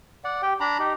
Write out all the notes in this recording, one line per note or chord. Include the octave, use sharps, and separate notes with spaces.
D5 F#5
G4 G5
D4 A#5 B5
D#4 G4